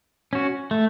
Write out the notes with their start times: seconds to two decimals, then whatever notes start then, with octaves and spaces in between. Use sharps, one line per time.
0.33 C#4 F#4
0.71 A3